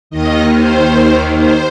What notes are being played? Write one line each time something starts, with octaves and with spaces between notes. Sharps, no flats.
D#2 D#3 D#5
C5
C5